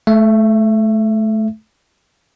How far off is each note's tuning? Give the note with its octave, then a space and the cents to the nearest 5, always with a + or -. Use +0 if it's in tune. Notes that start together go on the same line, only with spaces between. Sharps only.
A3 -25 E5 +25